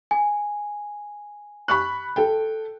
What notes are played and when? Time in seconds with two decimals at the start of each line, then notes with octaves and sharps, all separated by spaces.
0.11 G#5
1.68 B5 C#6 F#6
2.16 A4 G5